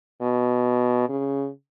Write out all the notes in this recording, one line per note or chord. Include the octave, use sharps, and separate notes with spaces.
B2
C#3